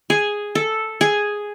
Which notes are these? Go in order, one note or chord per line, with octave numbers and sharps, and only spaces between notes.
G#4
A4
G#4